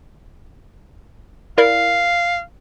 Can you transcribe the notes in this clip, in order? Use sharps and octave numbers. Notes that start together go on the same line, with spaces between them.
E4 A#4 D5 F5